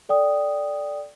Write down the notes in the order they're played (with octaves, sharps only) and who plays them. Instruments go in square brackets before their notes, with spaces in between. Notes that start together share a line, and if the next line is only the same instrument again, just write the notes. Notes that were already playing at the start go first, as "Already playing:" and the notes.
[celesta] A4 D5 G5 D#6